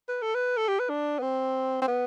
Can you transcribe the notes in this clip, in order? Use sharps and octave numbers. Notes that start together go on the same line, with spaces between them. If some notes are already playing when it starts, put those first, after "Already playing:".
B4
A4
B4
A4
G4
B4
D4
B3
C4
C4
B3